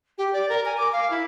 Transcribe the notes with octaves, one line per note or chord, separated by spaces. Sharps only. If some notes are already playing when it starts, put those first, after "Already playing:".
G4
D5
A#4
G#5
D6
F5
E4